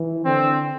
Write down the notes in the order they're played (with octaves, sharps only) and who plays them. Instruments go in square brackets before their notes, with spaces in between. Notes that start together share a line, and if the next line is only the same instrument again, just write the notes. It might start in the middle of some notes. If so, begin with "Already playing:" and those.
Already playing: [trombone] E3
[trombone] D3 [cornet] C4